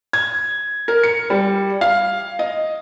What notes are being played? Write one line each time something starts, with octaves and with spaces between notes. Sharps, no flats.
G#6
A#4
C#7
G3
F5
D#5